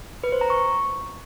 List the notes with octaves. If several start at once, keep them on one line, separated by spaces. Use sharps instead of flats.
B4
C5
A#5
C#6